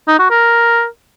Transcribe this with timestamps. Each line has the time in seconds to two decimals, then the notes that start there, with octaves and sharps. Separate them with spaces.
0.08 D#4
0.19 F#4
0.31 A#4